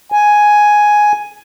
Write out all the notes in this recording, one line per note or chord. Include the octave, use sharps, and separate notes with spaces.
G#5